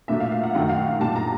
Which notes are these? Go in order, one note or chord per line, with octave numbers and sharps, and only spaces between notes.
A#2 F#3 A3 E5
F5
F5
F#5
F#2 D#3 F#3 A3 F#5
F5
A#2 G3 A5
A#5